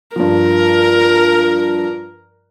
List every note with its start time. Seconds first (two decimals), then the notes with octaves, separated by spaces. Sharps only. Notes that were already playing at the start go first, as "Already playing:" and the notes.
0.16 G2 F3 A#4